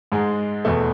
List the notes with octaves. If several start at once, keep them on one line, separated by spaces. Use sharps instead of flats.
G#2 G#3 G#4
E2 B2 A3